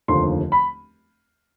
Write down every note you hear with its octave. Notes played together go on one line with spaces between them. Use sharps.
F1 D#2 D3 F3 C6
B5